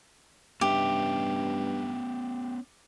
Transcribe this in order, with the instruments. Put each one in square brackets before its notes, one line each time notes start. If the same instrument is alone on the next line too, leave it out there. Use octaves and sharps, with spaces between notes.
[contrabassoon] G2 [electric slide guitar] B3 C#4 E5 [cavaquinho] G4